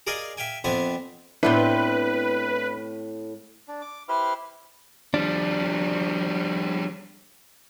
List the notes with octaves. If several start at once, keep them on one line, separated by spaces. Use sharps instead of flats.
G#4 A#4 D5 D#5 F5 G#5
E5 F5 G5 G#5
F2 B3 C4 D4 E5 G#5
A2 B3 C4 D4 E4 B4
D4
D6
E4 G4 B4 C5 C6 F6
F3 G3 D4